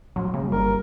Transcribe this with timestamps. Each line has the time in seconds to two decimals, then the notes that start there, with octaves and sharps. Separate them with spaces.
0.16 A#1 F#2 A2 F#3
0.34 F#1 C#3 G3 A#3
0.52 G1 A#4